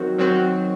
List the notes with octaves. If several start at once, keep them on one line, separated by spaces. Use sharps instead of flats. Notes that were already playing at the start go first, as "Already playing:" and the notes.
Already playing: D#3 F#3 C4 F#4
D#3 F#3 C4 F#4